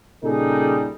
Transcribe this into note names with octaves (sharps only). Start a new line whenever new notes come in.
A#2 C#3 G3 D#4 G#4 A4